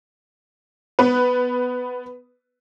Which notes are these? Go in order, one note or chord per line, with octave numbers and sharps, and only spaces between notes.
B3 B4